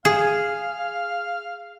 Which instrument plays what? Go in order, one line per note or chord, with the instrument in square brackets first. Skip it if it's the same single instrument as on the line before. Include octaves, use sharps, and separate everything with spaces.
[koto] G#4 [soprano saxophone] F5